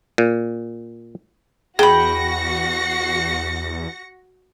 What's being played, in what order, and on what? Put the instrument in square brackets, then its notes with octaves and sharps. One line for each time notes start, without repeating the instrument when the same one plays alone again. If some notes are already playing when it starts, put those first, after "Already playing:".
[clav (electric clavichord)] A#2
[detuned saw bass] E2 [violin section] F#4 A#6 C#7 [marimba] G#4 [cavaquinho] G5 B5